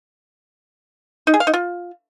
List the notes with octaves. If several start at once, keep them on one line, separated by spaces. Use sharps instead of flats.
D#4
G#4
F5
D#4
F4